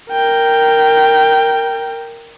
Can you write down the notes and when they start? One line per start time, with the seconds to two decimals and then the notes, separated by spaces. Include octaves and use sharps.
0.11 A#4 G5